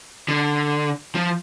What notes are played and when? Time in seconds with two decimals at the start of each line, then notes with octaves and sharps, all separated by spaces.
0.28 D3
1.15 F3